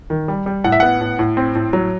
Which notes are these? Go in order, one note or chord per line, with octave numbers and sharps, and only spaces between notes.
D#3
G3
G3
A2 F#5
E5
B3 F#5
A2
A2
C4
A2
F#3